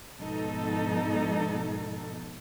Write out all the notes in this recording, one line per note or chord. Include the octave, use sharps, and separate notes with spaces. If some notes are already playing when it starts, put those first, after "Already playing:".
G#2 B2 F3 B3 D#4 A4